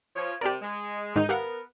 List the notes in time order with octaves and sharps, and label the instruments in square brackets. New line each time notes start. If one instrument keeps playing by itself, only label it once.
[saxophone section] F3 C#5
[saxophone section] C3 G3 D5 [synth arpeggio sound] G4 A#4
[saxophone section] G#3
[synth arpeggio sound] G#2 D#3 [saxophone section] D#4
[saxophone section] B3 A#4 [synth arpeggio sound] G4 F5 F#5